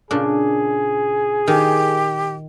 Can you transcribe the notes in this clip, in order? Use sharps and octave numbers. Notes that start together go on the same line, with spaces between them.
A#2 C#3 D4 G#4
D#3 G4